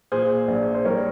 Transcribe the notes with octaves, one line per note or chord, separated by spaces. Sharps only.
A#2 G#4 C5
A#1
C5
G3 A#4 C#5